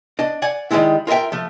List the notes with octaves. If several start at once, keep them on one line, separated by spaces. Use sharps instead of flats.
D4 D#5
D5 F#5 G#5
D#3 F3 G3 G#3 E4
F4 A#4 D#5 E5 G5
F3 A3